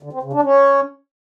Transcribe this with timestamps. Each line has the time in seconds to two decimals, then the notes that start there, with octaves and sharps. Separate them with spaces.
0.03 D3
0.13 C4
0.23 C#3
0.33 D4
0.43 C#4